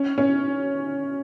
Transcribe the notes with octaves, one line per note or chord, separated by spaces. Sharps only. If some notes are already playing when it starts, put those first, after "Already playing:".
Already playing: C#4
C#4